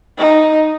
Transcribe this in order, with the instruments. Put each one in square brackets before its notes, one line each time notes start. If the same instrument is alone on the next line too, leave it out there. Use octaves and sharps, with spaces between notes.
[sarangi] D#4